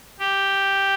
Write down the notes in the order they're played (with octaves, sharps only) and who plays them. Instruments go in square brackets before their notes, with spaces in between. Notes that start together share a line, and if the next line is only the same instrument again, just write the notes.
[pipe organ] G4